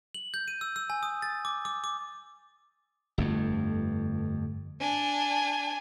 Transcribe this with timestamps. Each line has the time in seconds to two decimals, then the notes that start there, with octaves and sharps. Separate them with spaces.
0.14 F#7
0.34 G6
0.48 D#7
0.61 E6
0.76 E6
0.90 G#5
1.03 D#6
1.22 A6
1.45 D6
1.65 D6
1.84 D6
3.18 G1 F2 A3
4.81 D4 G#5